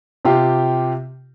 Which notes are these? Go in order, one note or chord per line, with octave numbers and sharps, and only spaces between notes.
C3 F4 G4